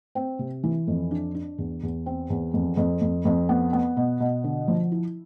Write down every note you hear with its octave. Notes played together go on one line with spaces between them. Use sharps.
C4
C3
E3
F2
D4
D4
E2
E2
C4
E2
F2
F2
F2
F2
B3
B3
B2
B2
D3
F3
E4